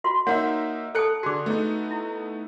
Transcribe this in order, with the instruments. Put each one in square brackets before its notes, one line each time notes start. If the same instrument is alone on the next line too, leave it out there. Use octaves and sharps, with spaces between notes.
[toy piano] F4 F#4 C6
[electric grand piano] A#3 D#4 E5 [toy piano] C#5 F#5
[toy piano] A4 A5 D#6 [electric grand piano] A#5 F#6 C#7
[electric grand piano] D3 G#4 [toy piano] F#4 D6
[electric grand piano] A3 B3 D#4
[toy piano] E4